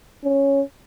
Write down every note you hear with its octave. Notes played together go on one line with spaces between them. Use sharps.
C#4